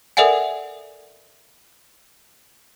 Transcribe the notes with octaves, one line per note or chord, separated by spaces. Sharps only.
A4 A#4 D5 E5 F#5 G#5